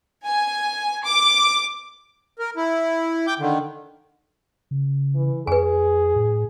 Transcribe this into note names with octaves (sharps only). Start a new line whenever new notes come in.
G#5
D6
A#4
E4
G5 D6 G6
D3 D#3
C#3
E3
F2 G#4 B4 G#5
A2